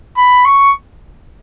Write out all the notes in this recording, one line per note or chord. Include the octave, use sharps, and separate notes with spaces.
B5
C#6